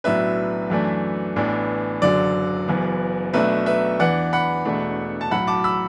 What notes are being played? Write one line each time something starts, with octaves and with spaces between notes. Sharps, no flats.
B1 A2 F#3 B3 D4 B4 E5
F#2 E3 A3 D4
A1 A2 E3 B3 D4
F#1 F#2 D3 F#3 D5
F#1 F#2 E3 B3
B1 B2 A3 D4 B4 E5
B4 E5
E2 E3 B3 D4 D5 F#5
F#5 B5
E1 E2 B2 A3 D4
A5
B1 A2 F#3 F#5 B5
A5 D6
B5 E6